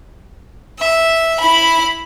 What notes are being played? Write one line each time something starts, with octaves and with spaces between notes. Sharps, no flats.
E5
E4 B5